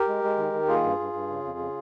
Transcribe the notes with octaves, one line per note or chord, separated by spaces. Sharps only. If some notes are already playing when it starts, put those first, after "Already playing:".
Already playing: G4 A#4
G#3
G#3
D#3
D#3
A#3 F4 G#4
G2
G2
G2
C#3
F2
C#3